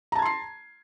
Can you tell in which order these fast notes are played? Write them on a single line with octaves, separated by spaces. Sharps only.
A#5 A5 G#6 C6 C7